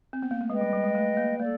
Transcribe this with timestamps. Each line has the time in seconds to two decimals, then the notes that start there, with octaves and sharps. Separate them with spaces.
0.13 C4
0.22 B3
0.31 A#3
0.41 A3
0.50 G#3 G#4 B4 D#5 G5
0.61 G3
0.73 G3
0.84 G#3
0.95 A3
1.17 A#3
1.39 A#3 A4 D5